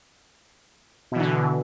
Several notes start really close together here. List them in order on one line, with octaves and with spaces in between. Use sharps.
B2 E3 D3